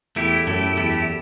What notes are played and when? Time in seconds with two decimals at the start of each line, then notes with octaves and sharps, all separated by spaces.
0.16 E2 A3 E4 G4
0.47 F#2 A3 E4 G4
0.77 E2 A3 E4 G4